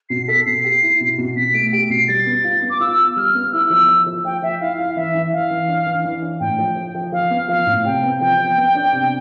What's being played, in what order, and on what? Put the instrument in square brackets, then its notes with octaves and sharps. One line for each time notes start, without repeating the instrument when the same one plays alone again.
[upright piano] B2 [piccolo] C7
[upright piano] A4 [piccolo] B6
[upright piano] B2 [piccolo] C7
[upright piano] G4
E4
B2
B2
[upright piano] B2 [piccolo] B6
[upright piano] A3 [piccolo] D7
[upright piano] G4 [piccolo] D7
[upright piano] B2 [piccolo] C7
[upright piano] G3 [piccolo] A6
[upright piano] B3
F4
B3
[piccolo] D6
[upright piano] F4 [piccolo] E6
[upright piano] F4
[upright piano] G3 [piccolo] F6
[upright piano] B3
[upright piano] E4 [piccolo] E6
[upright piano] F3
F3
F3
[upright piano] F3 [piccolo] G5
[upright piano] F3 [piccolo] E5
[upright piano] E4 [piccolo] F5
[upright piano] E4 [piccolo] F5
[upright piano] E3 [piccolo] E5
[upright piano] E3
[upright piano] E3 [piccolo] F5
[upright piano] E3
D4
E3
E3
D4
[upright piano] A2 [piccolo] G5
[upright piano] F3
F3
F3
[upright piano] F3 [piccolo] F5
[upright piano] B3
[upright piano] F3 [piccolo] F5
[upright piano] A2
[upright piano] C3 [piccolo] G5
[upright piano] B3
[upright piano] F3 [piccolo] G5
[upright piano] F3
B3
D4
C3